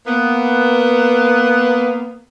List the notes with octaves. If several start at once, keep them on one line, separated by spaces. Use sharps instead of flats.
A#3 B3